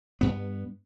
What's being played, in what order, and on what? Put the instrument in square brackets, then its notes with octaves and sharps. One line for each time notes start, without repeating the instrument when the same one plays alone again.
[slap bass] G2 B3